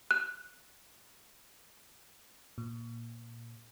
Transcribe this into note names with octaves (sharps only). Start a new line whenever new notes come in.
F#6
A#2